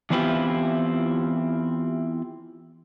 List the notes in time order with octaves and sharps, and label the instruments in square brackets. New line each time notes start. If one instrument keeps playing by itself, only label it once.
[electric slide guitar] E3 B3 C4 E4 F4 G4